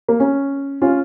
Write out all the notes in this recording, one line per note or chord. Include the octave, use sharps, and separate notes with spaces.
A#3
C#4
C#4 F4